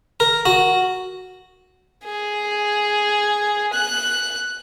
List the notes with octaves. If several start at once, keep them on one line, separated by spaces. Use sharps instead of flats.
A#4
F#4
G#4
F#6